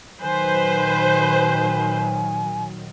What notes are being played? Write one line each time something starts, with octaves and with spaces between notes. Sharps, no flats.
A#2 D#3 F#3 B4 C5 G#5